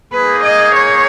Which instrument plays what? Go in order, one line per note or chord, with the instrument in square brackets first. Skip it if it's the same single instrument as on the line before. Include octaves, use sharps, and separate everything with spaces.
[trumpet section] A#3 D#4 G#4 [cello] B4
[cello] D#5
C#5